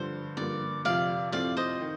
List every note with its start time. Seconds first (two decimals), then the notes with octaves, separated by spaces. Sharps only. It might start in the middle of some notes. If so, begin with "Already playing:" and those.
Already playing: G2 D3 F3 C5
0.37 G2 D3 F3 A#3 D5
0.85 F2 C3 F3 D5 F5
1.32 A2 F3 C4 F4 A4 D5 F5
1.57 C5 D#5
1.81 D#3